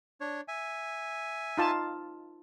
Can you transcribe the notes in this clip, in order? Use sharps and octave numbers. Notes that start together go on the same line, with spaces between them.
D4 C#5
E5 G#5
D#4 F4 A5